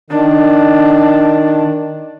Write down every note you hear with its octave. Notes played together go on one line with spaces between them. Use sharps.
D#3 D4